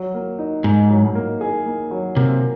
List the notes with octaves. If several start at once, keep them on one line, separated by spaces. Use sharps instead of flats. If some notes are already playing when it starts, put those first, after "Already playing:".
Already playing: F#3
A#3
D#4
G#2 D#4
F#3
A#3
G#4
A#3
F#3
C3 A#3